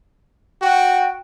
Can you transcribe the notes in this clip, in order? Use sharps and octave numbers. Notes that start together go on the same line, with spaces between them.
F#4 G5